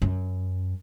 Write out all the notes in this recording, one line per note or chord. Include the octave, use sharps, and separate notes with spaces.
F#2